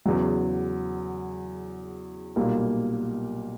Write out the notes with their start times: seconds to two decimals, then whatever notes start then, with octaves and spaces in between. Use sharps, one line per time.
0.06 E2 C#3 F#3
2.36 B1 A#2 G3 A#3